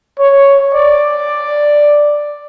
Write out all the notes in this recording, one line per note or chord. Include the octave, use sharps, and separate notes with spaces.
C#5
D5